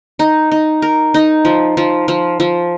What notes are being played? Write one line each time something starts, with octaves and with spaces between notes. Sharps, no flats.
D#4
D#4
A#4
D#4
F3
F3
F3
F3